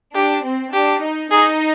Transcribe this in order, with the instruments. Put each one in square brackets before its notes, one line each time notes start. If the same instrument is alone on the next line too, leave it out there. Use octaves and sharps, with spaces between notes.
[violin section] D4 [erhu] G4
[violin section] C4
[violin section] D4 [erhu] G4
[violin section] D#4
[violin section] D#4 [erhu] G#4